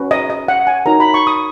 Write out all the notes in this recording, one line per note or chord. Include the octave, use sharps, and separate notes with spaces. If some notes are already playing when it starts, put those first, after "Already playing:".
Already playing: C#4 F#4 B4
D#5
D#5
F#5
G#5
D#4 F#4 A#4 C#5 A#5
B5
C#6
D#6